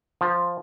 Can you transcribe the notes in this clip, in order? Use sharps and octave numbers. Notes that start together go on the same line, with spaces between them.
F3